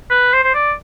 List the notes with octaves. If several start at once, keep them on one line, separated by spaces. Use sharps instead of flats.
B4
C5
C5
D5